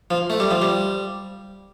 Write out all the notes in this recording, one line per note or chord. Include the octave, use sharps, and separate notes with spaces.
F3
A3
G3
F3
G3